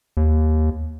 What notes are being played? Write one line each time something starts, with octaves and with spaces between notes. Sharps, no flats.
D#2